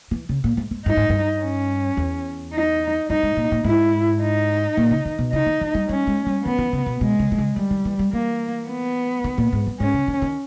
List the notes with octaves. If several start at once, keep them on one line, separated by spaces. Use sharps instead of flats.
E3
C#3
A#2
G#2
G#2
G2 D#4
G#2
G2
C#4
E2
D#4
G2 D#4
G#2
A#2
A#2
G#2 E4
D#4
A#2
C#3
D#3
B2
C#3 D#4
D#3
E3
G3
G3 C#4
G#3
G3
E3 B3
E3
C#3
B2
B2 G#3
C#3
D#3
C#3
D#3 G3
D#3
E3
G3
E3 A#3
B3
D#3
A#2
G#2
G2
G#2 C#4
C#3
D#3
D#3